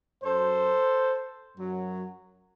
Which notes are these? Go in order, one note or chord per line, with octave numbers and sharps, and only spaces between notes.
F#2 F#3 A4 C5
F#2 F#3